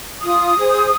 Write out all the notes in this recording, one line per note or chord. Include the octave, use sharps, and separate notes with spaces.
F4 D#6
G#4 C5